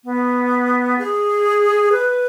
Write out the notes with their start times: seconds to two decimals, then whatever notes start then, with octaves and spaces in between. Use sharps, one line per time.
0.04 B3
0.98 G#4
1.92 B4